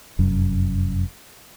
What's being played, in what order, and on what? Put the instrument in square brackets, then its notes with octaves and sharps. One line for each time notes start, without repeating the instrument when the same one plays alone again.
[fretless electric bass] F1 F#2